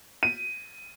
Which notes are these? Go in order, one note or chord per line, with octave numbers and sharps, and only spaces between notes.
D#7